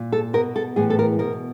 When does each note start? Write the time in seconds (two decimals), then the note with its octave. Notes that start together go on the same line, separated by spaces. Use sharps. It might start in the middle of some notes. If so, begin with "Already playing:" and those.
Already playing: A#2
0.12 A4
0.33 B2 A#4
0.56 A4
0.76 A2 E3 G#4
0.90 A4
0.99 A#4
1.19 B2 A#4